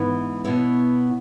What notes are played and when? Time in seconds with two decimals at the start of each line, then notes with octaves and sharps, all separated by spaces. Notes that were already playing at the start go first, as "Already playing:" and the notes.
Already playing: G#2 E3 B3
0.44 B2 B3 E4 C#5